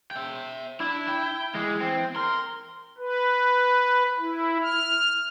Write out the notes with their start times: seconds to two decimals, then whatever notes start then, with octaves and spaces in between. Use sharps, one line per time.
0.11 E5 G5
0.80 D4 E4
1.08 G5
1.55 E3 G#3
1.81 C4
2.16 A#4 C6
2.98 B4
4.19 E4
4.63 F6